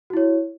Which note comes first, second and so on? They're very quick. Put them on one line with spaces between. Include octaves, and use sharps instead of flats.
F#4 E4 C#5